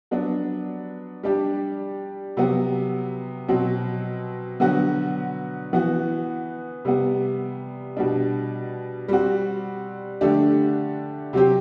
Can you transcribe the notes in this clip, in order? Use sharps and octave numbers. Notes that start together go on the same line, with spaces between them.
F#3 B3 D4
G3 D4 G4
C3 F#3 B3
B2 F#3 C4
D3 F#3 B3 F#4
E3 B3 F#4
C3 G3 B3
B2 G3 D4
G3 C4 F#4
D3 A3 D4 G4
C3 F#3 C4 G4